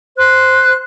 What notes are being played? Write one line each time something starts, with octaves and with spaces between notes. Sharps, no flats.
C5 F#6